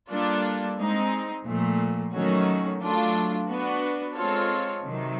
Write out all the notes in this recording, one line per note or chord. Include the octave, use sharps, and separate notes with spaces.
G3 A#3 D4 F4 A4
G#3 C4 D#4
A#2 F3 A3
D#3 F#3 A3 C#4 F#4
F#3 A3 D4 F4
B3 D4 F#4 B4
G#3 C4 F4 A4 C#5
C3 D#3 F#3